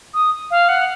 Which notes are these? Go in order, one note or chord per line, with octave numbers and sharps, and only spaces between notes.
D#6
F5
F#5